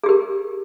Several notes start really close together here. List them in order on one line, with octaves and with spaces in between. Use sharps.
G#4 G4 A#4